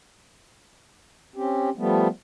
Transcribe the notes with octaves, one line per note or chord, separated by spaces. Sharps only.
C4 C#4 G4
F3 G3 A3 B3